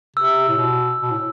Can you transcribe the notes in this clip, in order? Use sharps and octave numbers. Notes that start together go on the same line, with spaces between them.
C3 E6
A2
B2
B2
A2